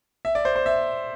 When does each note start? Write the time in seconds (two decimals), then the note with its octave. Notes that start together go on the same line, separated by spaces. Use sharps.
0.25 E5
0.35 D5
0.45 C5
0.56 C5
0.66 E5